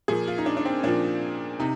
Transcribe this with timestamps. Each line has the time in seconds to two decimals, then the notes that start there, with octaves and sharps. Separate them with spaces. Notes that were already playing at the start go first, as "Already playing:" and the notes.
0.08 A#2 F3 G#4
0.27 F4
0.38 D#4
0.46 D4
0.57 D4
0.65 C4
0.83 A#2 F3 D4
1.59 C3 D#4